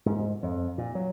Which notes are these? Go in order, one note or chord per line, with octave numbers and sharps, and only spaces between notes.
G#2
F2
A#2
F#3